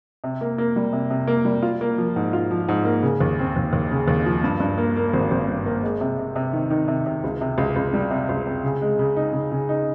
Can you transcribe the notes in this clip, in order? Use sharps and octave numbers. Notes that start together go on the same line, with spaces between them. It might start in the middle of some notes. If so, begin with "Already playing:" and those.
C3
A#3
A#3
G3
C3
C3
A#3
G3
F4
A#3
F3
G#2
F4
F3
G#2
A#3
C#3
D#2
C4
D#2
D#2
C#3
D#2
F3
G2
G2
A#3
A#3
G#1
G#1
G2
A#3
G#3
C3
C3
C3
D#3
D#3
C3
C3
C#2
C3
C#2
C#2
G3
C3
C#2
C3
C#3
G#3
C#3
D#4
C#3
C#3
D#4